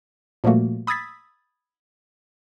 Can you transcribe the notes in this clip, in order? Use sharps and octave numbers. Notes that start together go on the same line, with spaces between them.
A#2 F3 G3 A3 A#3 F#4
B5 D#6 E6 G#6 A6 B6